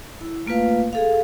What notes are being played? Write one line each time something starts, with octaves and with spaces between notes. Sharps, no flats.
E4
A3 A#3 F4 B4 F5
G#4 A4 F5